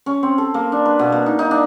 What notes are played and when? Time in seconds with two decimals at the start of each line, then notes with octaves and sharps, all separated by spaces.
0.06 C#4
0.23 C4
0.38 A4
0.54 A#3
0.72 D4
0.85 B4
0.99 B2
1.12 A#3
1.26 D#4
1.39 D#4
1.51 D4